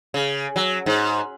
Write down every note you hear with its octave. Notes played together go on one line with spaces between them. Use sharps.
C#3
F#3
G#2